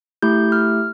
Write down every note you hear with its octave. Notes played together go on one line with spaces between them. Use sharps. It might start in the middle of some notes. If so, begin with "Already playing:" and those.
A3 E4 G4 G6
F6